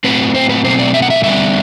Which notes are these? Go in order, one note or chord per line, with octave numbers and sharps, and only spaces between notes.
A2 F#3 C4 B4
C5
B4
B2 F#3 A3 C4 C5
D5
E5
F#5
E5
D3 G3 B3 D4 E5